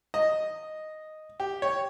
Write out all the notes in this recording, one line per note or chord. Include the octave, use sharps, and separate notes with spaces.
D#5
G4
C#5